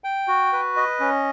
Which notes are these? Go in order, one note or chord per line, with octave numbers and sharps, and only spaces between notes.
G5
F#4
B4
D#5
C#4